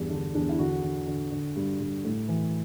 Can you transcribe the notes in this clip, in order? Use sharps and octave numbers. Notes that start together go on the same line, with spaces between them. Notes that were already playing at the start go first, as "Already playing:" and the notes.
Already playing: E2 G2
D3 D4
E2 D4
E4
D3 F#4
D3
D3
D3
G2
G2
A2
E3